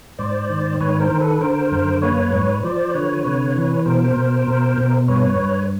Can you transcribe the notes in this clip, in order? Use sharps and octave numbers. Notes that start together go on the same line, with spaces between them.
G#2 C5 D5
D#3
G#2 B4 C#5
A#4 C5
D#3
A4 B4
D3 A#4 C5
F#2
A#3 B4 C#5
G#2
F3 C5 D5
D3 B4 C#5
C3 B4 C#5
E3
B2 A#4 C5
B2
B2
B2
G2 B4 C#5
G2